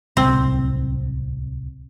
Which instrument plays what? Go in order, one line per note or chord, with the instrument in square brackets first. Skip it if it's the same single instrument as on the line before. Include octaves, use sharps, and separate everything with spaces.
[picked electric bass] D1 C2 [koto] C4